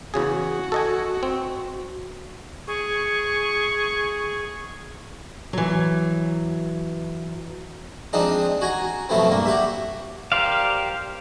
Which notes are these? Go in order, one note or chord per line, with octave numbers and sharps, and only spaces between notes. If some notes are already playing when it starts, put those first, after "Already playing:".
E2 C#3 F#4 G#4
A4 D#5 G#5
C4
G#4 C#6
E3 F#3
F3 G#3 C4 D4 D#4
F#4 G#5 A#5
B2 F3 F#3 A3 B3 C4
G2 A#3
F#4 G4 E5
G4 A#4 C5 D5 F5